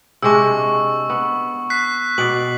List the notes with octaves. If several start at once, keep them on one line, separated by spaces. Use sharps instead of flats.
C3 G#3 D4 C#6 E6
B3
F#6 B6 C7
B2 D5 F#7